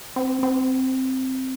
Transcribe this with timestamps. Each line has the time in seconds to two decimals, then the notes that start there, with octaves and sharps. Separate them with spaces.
0.16 C4
0.43 C4